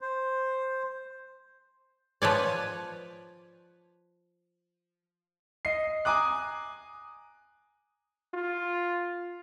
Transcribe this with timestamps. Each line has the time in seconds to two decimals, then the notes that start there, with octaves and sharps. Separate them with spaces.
0.01 C5
2.22 F3 B4 C#5 D5
5.65 D#5 C7
6.05 G#5 A#5 D6 D#6 F#6
8.34 F4